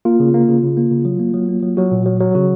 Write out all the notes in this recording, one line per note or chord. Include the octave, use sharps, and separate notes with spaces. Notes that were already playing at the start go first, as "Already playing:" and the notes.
A#3 F4
C#3
A#3
C#3
C#3
A#3
C#3
F#3
A#3
F#3
A#3
F#3
F#3 F#4
A#2
F#3
F#3
C#3 F#4